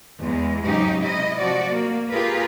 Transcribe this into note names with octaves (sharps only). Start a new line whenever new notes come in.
E2 G#3
G#2 C#3 F#3 D#4 G4
C3 E4 D#5
F3 F#4 D5
A#3
F4 G4 G#4 A#4 B4